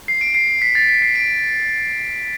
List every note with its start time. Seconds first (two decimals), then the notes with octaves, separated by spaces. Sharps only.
0.08 C7
0.21 D7
0.35 C7
0.49 C7
0.62 B6
0.75 A6
0.89 B6
1.02 C7
1.16 D7